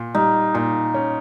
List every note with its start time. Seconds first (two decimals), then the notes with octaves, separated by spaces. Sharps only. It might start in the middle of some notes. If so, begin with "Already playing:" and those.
Already playing: A#2
0.15 G3 D#4
0.54 A#2 D#4
0.94 C#4